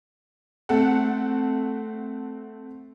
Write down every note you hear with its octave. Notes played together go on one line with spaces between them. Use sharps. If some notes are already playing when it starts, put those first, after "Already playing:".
A3 C4 A4 F#5